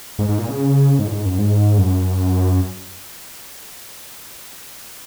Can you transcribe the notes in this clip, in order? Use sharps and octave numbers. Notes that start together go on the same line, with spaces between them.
G#2
G#2
A#2
C#3
G#2
A#2
G#2
F#2
G#2
F#2